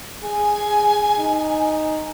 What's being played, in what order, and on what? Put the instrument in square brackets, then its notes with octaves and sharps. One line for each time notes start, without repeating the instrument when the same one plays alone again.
[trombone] G#4 [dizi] G#5
[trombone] D#4